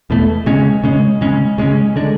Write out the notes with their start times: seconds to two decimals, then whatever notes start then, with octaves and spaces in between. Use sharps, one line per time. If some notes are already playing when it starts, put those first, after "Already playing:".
0.10 E2 B2 A3
0.46 C#3 G#3 C#4
0.84 C#3 G#3 C#4
1.21 C#3 G#3 C#4
1.58 C#3 G#3 C#4
1.96 D3 G#3 D4